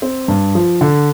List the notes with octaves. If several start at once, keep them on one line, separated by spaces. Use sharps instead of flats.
C4
G2
F3
D3